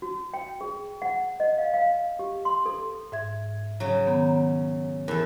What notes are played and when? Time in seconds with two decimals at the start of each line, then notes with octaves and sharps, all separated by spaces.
0.02 F#4
0.34 G5
0.61 G#4
1.02 F#5
1.40 D#5
1.58 F5
1.74 F5
2.19 G4
2.45 C6
2.66 A4
3.12 G#2 E5 G#6
3.80 C#3 F#3
4.06 D#3 B3 A#5
5.08 E2 A4 A#4